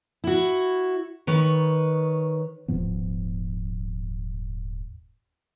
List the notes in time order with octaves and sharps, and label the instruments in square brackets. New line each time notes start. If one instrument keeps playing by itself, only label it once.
[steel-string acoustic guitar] E4 F#4
D#3 B4 C#5
[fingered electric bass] D#1 G#2 F3 B3